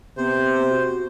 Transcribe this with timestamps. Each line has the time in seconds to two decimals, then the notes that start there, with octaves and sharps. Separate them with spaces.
0.17 C3 B3 C5
0.70 F#4